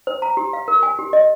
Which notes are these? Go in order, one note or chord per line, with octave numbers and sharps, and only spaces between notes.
C5
A#5
G4
F5
A#4
G#5
G4
D#5